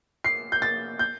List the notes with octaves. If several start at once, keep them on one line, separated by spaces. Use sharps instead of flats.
C7
G6
A6
G6